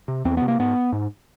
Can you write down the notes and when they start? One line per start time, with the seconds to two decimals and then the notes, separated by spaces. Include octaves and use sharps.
0.08 C3
0.25 E2 C4
0.37 C3 B3
0.48 A#3
0.59 G#2 B3
0.92 G#2